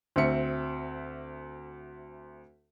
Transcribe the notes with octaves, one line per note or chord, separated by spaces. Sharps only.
D2 C4 E5 C#7